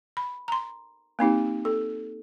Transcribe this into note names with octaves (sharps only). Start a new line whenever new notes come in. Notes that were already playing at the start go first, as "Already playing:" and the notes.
B5
A#5 C6
A#3 C4 D#4 G4
A4